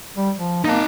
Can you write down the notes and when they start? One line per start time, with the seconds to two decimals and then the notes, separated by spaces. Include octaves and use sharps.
0.16 G3
0.36 F3
0.65 A#3 D#4 A5